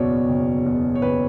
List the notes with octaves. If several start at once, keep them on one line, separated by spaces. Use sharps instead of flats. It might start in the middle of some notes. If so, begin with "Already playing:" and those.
Already playing: F#1 E2 B2 C#5 D5
F#1
E2 B2
C#5
F#1 B4